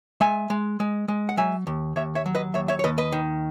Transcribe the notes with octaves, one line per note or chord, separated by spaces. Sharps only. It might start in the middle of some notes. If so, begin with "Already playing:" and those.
G#3 E5 G#5
G#3
G#3
G#3
F#5
F#3 E5 G#5
D#2
D#2 C#5 E5
C#5 E5
F#3
B4 D#5
D#2 C#5 E5
C#5 E5
C#5
D#2 B4 D#5
B4 D#5
D#3